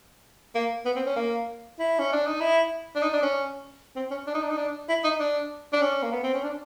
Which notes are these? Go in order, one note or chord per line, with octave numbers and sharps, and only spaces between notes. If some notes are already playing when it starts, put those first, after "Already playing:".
A#3
B3
C4
C#4
A#3
E4
C#4
D4
D#4
E4
D4
D#4
D4
C#4
C4
C#4
D4
D#4
D4
D#4
D4
E4
D#4
D4
D4
C#4
A#3
B3
C4
C#4
D4